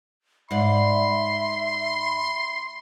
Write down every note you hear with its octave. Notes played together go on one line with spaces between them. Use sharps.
G#2 D5 E5 B5 C6